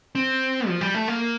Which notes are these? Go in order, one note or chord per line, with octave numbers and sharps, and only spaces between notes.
C4
F3
G3
A3
A#3